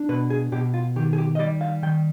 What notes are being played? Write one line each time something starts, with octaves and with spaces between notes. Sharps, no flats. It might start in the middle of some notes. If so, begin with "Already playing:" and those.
Already playing: D4
B2 B4
G#4
B2 G4
F4
D#3 G4
G#4
G4
D#5
G3 D5
F5
D#3 G5